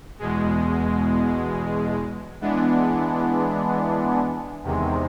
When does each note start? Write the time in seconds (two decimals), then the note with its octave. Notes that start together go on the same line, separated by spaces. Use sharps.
0.19 E2 B2 G#3
2.41 E3 G#3 B3 D4
4.64 E2 C3 D#3 G#3